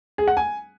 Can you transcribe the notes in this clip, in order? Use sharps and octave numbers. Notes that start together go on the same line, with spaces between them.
G#4
F#5
G#5